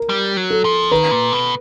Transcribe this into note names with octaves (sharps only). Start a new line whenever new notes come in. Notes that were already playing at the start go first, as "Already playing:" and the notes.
Already playing: A#4
G3
F#3
A4
F3
D#3 B4
A#2
B2